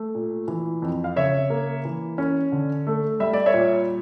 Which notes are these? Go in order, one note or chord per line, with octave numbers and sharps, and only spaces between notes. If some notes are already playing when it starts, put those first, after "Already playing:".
Already playing: A3
A#2
E3
F2
F5
C#3 C#5 E5
A#3
E3
C#4
D3
A3
G3 E5
D5
C#5 E5
A#2